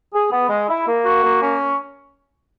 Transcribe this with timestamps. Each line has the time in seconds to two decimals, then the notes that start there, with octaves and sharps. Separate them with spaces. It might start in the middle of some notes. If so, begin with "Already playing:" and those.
0.13 G#4
0.31 B3
0.49 G#3
0.68 E4
0.85 A#3
1.04 F#4
1.23 A#3
1.41 C#4